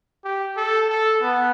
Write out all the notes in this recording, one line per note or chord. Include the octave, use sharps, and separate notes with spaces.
G4
A4
A4
B3